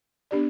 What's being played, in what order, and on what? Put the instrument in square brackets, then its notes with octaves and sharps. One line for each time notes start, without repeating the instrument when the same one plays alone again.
[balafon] B3 D4 G4 D5